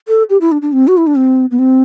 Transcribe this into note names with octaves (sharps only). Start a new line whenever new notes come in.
A4
G4
E4
D4
D4
C4
F#4
E4
D4
C4
B3
C4